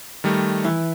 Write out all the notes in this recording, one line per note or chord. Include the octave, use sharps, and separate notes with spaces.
D#3 G3 A3
E3